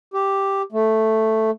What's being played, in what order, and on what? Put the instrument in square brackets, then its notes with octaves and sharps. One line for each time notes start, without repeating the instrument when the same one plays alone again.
[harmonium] G4
A3